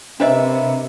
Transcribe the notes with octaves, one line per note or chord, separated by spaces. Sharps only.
C3 A#3 D4 B4 C5 D#5 E5